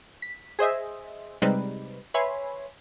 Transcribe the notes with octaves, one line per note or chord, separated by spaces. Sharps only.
B6
G#4 C5 D#5 E5
C3 G3 G#3 C4 D#4 B4
B4 C#5 E5 G#5 B5 C6